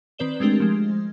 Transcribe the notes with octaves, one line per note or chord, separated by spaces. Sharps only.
D#3 C4 B4 D5 E7 G7
G#3 A3 C4 D4 G4 A#4
F3 G#3